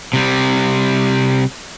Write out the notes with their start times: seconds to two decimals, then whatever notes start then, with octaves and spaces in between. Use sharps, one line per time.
0.13 C3 G3